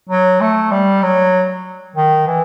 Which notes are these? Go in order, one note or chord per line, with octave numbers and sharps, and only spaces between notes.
F#3
A3
G3
F#3
D#3
E3